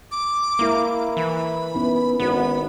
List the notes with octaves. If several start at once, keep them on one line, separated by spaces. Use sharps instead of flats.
D6
G#3 A#3 E4 A#4
E3 B5
B3 C#4 D#4 E4
G#1 D#3 B3 D#4 F#4 B5